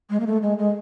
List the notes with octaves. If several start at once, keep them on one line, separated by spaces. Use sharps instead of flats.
G#3
A#3
A3
G#3
G#3